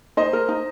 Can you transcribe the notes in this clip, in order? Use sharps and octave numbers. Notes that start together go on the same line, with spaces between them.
D#4 C5 D#5
A#4
D#4